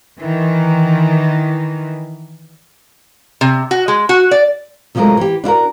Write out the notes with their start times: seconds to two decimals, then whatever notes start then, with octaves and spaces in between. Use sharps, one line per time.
0.20 D#3 E3
3.41 C3
3.71 F#4
3.88 G#3
4.09 F#4
4.31 D5
4.95 C3 F3 F#3 G#3 A3 A#4
5.17 E3 G4
5.44 D4 E4 F#4 A#4